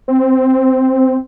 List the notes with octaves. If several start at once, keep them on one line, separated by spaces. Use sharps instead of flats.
C4